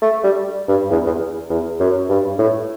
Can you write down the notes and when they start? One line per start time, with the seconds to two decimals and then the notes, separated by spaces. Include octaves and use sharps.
0.02 A3
0.24 G3
0.68 G2
0.90 E2
1.06 E2
1.50 E2
1.80 F#2
2.10 G2
2.39 A2